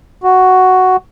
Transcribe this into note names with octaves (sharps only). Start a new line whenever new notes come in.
F#4